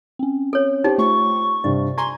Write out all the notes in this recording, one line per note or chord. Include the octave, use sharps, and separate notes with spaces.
C4 C#4
A4 C#5
D#4 G4 C5 C#5
A3 F4 C#6
G2 C3 D5
G#5 A#5 C6 C#6 G#6